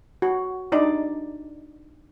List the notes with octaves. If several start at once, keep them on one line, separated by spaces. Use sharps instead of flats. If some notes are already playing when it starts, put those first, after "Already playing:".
F#4
D4 D#4 D5